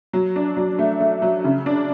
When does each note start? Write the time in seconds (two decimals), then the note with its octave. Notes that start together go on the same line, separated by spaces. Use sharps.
0.13 F#3
0.36 D4
0.57 F#3
0.79 A3
1.00 A3
1.22 F#3
1.44 C#3
1.66 D4